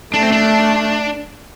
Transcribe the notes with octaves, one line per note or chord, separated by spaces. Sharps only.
A3 D4
C4
D4